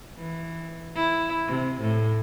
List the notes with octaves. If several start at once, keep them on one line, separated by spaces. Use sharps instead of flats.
E3
E4
C3
A2